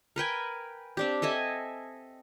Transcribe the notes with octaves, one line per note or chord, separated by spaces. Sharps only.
A#4 B4 G5 G#5
C4 D4 G4
A4 D#5 E5 G#5